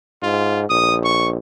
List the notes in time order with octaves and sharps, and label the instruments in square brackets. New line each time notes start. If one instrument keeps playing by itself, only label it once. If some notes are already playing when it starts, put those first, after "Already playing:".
[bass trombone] G#2 [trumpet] F4
[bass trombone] A#1 [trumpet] D#6
[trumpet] C#6